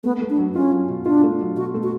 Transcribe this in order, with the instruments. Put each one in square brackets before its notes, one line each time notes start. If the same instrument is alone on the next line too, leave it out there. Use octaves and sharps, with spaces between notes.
[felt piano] A3 [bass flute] B3
[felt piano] A3
[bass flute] D4
[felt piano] F#3
[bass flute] C#4 [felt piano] F4
[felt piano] F#3
B2
[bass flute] D4 [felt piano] F4
[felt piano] A3
F#3
[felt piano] B2 [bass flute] F#4
[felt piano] A3
[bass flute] F#4